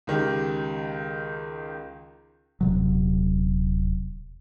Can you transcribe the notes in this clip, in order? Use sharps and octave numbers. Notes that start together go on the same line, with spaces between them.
C#2 D#3 G4
D#1 C3 F#3